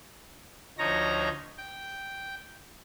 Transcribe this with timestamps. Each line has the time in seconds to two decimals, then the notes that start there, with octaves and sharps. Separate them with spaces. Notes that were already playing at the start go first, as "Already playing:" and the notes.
0.78 D2 F3 D#4 C#5 A#5 A#6
1.58 G5